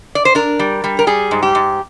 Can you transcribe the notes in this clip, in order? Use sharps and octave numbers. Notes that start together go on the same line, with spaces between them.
D5
C5
D4 A#4
G3
G3
A#4
G3 G#4
G#2
G4
G#2